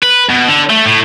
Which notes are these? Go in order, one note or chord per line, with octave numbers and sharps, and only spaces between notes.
B4
B2
D3
A3
A2